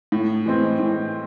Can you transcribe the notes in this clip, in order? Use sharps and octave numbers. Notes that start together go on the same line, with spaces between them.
A2
E3 G#3 C4
A2